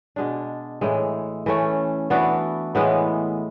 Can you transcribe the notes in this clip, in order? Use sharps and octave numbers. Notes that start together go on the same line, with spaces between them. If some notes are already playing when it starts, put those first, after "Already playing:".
B2 G#3 D4
A2 E3 G#3
E3 A3 C#4
E3 B3 D4 F#4
A2 E3 G#3 B3